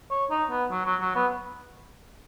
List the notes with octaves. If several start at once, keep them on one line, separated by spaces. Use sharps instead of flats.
C#5
D#4
B3
F#3
F#3
F#3
B3